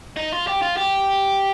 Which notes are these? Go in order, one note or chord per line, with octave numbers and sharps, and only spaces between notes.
D#4
F4
G4
F4
G4